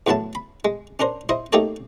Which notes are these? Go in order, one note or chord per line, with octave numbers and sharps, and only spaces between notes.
E2 A2 F#3 E4 A5
B5
G#3
C#4 D4 A#4 C5
E4 C5 D#5
A3 A#3 D#4 G4 A4 C#5